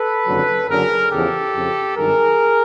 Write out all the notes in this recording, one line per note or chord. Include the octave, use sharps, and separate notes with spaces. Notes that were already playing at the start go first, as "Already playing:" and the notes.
Already playing: A4 B4
F#1 F2 D3 F#3
F#1 F#2 D3 F#3 G#4 A#4
E2 C#3 F3 G4 A4
F2 C#3 F3
G#1 G2 D#3 F#3 G#4 A#4